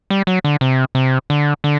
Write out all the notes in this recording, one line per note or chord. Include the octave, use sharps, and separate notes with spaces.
G3
F#3
D3
C3
C3
D3
D3